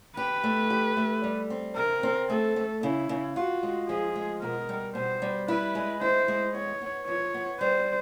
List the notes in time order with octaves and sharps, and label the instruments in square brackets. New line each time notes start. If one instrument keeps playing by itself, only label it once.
[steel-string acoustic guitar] G4 [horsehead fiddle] B4
[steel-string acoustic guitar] A3
G4
A3
G3
C4
[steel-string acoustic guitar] C3 [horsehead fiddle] A#4
[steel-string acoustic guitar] C4
[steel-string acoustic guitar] A3 [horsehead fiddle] A4
[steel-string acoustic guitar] A3
[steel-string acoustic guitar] C#3 [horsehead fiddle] E4
[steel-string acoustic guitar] C#3
[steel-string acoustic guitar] F4 [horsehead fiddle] F#4
[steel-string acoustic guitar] G#3
[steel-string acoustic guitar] F3 [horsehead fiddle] G#4
[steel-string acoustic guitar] G#3
[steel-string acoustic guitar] B2 [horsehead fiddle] A#4
[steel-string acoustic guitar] G3
[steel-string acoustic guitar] B2 [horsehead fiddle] C5
[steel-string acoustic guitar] G3
[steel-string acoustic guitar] E4 [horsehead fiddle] B4
[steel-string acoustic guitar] G#3
[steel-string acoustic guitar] E4 [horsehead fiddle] C5
[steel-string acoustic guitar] G#3
[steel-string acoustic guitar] B3 [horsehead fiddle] C#5
[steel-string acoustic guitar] B3
[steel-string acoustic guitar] F3 [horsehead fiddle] C#5
[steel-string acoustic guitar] B3
[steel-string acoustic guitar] G3 [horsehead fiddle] C5